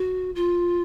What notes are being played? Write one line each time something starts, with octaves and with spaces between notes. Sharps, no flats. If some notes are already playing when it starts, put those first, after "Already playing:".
Already playing: F#4
F4